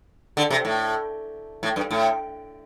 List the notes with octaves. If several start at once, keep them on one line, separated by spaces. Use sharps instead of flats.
D3
C3
A2
A2
G2
A2